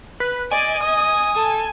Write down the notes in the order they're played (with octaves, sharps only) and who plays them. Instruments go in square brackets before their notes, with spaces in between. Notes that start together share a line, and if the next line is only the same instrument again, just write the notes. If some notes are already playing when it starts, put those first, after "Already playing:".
[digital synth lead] B4 [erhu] F#6
[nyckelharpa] D5 [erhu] D#5 [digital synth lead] G#5
[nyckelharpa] D#6
[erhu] A4